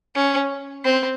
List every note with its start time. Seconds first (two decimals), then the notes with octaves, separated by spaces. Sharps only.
0.15 C#4
0.84 C4